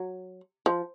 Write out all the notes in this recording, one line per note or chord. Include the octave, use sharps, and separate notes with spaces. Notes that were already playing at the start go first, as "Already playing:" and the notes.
Already playing: F#3
F3